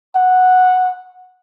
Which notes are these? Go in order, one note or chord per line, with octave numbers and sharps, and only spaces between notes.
F#5